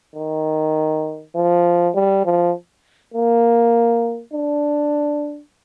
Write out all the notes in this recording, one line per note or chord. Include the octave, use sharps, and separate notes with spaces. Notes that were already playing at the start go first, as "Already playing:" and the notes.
D#3
F3
G3
F3
A#3
D4